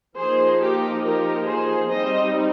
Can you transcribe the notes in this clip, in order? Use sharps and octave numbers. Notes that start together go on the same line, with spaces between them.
F3 A#3 D#4 G#4 C5
G4 A#4
G4 A#4
G#4 C5
G3 C4 D#4 C5 D#5